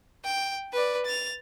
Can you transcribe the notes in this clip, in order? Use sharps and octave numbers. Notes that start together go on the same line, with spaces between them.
G5
B4 D5
A6 F7